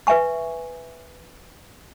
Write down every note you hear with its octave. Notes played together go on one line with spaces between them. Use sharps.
B4 E5 G#5 C#6